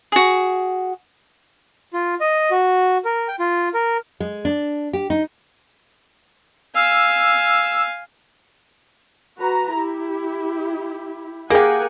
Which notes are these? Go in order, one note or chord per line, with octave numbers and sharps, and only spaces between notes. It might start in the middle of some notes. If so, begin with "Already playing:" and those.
F#4 G#4
F4
D#5
F#4
A#4
G5
F4
A#4
G#3
D4
G4
D#4
F5 G#5 E6
F#4 B4 A#5
E4 G4
A#3 G4 G#4 A#4 F#5 G#5